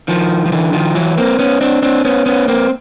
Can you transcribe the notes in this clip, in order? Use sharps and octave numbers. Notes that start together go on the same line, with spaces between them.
D#3 F3
F3
D3 E3
D#3 F3
E3 F#3
A#3 C4
B3 C#4
C4 D4
C4 D4
B3 C#4
B3 C#4
A#3 C4